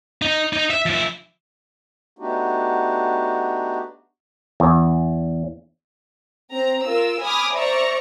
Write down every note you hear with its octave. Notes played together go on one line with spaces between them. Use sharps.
D#4
D#4
E5
F3 E5
A3 B3 D4 D#4 F#4 G4
E2
C4 A#5
F4 A#4 E6
G#5 B5 D6 D#6 F6
C5 D5 E5 A#5 C#6